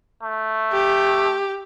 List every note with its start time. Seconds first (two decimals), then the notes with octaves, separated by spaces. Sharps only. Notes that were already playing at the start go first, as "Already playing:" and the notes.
0.22 A3
0.73 G4